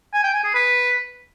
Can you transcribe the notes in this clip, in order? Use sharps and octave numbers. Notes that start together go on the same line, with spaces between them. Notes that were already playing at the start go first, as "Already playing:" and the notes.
G#5
G5
G#5
G#4
B4